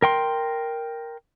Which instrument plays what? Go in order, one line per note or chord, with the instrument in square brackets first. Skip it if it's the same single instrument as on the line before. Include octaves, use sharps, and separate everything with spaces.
[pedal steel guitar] A#4 G5 C6